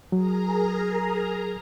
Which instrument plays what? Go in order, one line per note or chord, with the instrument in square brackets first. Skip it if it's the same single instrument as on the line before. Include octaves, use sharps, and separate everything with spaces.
[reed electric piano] F#3 [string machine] G#4 A#4 A#5